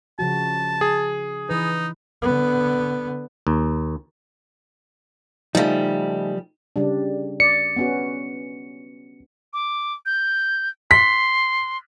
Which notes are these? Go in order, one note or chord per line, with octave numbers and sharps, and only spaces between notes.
C#3 F3 F#4 A5
G#4
E3 D#4 B4
D3 B3
D#2
C#3 F3 G3 A3 D#4
C#3 G3 D4
D5 C#7
B3 C#4 F#4
D6
G6
C6 B6